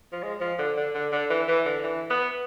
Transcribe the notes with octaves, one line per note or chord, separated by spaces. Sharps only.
F3
G#3
F3
D3
D3
D3
D3
E3
E3
D3
E3
B3